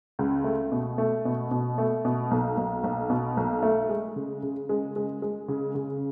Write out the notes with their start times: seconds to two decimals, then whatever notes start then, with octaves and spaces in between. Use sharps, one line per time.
0.19 C#2
0.44 A3
0.72 B2
0.98 A3
1.25 B2
1.51 B2
1.78 A3
2.05 B2
2.31 B1
2.57 B1
2.84 B1
3.10 B2
3.37 B1
3.63 A3
3.89 G#3
4.16 C#3
4.43 C#3
4.69 G#3
4.96 G#3
5.22 G#3
5.48 C#3
5.75 C#3